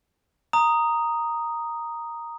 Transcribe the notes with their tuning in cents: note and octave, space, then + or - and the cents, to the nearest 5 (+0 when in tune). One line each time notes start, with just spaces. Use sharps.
A#5 +0 D#6 +0